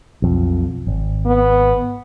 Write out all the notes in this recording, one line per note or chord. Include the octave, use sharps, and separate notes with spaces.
B1 F2
G#1
B3